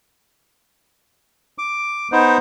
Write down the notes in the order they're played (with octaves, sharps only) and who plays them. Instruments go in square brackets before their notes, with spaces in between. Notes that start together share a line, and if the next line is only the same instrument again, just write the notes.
[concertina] D6
B3 D#4 C5